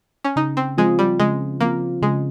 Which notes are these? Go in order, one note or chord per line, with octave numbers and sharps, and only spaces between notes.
C#4
C#3 D#4
C4
F3 G#3 C4 F4
G3
C#3 G#3
F3 A#3 C4 F4
C#3 G#3